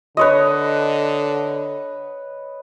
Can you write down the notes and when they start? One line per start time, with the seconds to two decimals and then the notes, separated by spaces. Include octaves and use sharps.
0.17 D3 B4 C#5 D#5